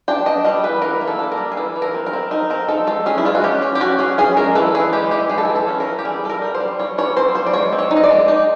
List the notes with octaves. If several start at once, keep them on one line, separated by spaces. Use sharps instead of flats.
D4 G5
D4 D#5
G3 D#5
E3 B4
E3 A#4
A#3
A4
D4
A#4
G3
G#4
E3 A4
E3
A#4
C4
A#4
C4
D#4 A#4
C4 A#4
D#4 A4
G#3 A4
C#4 G#4
E4
G#3 F4
F#4
C#4 G4
C#4
G4
C#4 F#4
C#4 G#4
C#4 G#4
G#3 A#4
E3 A4
E3 G#4
G#3 G4
E3 G4
G#3 G#4
A4
G#4
E3
A4
C#4
A#4
E3
G4
G3 G#4
G3 A4
A#4
G3
C5
G3
G3 C#5
G3 C#5
C4 C5
G3 C5
D5
G#3 C#5
C4
C#5
D#4
D#5
D5
G#3
D#4